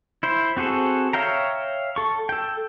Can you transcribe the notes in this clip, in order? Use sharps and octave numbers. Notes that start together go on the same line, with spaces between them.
E4 C5
C4 F#4 G#4 A4
C#5 E5 F5 G5 A#5
A4 C#6
A4 G5